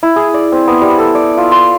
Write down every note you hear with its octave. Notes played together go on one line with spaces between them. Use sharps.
E4
G#4
D5
C4
B3
G3
A4
D5
F4
C6